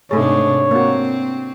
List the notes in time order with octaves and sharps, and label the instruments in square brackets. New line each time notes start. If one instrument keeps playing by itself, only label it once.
[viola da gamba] G#2 C3 D4 [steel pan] A3 G#4 [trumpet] C#5
[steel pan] A#3 F#4 [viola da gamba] C4